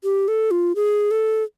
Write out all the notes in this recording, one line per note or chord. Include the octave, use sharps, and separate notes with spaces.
G4
A4
F4
G#4
A4